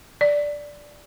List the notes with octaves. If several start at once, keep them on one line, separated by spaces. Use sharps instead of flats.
D5